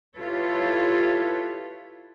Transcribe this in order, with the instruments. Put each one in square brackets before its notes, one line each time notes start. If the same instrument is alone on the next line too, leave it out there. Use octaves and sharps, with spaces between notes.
[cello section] E4 F4 G4 A4 B4 C#5